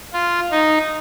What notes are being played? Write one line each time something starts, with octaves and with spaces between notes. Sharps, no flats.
F4
D#4